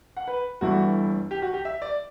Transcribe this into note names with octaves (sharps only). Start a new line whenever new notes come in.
F#5
B4
G1 G2 E3 A3 E4 F#4
G4
F#4
G4
E5
D5